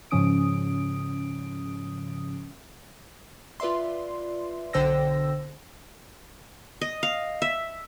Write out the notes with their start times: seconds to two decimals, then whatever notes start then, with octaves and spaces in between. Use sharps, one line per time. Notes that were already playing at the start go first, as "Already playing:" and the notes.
0.11 G#2 C#3 F3 C#4 D#6 D7
3.60 F4 B4 D5 E5 C6
4.73 B1 D3 C5 G5 E6 A#6
6.81 D#5
7.03 F5
7.42 E5